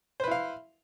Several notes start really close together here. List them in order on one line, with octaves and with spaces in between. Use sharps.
C5 B4 E4 F5